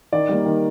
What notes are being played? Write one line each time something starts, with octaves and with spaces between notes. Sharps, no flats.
D#3 D5
G3 A#3
D#3